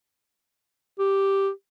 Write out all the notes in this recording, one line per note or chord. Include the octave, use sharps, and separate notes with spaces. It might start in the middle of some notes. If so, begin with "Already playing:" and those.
G4